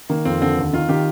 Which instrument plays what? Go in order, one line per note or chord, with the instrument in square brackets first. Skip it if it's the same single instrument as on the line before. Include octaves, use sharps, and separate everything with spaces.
[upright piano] D#3 [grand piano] A#3
[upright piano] F2 [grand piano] C4
[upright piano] D3 [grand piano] C4
[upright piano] D#2
[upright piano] D#3 [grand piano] F4
[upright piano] D#3 [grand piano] G4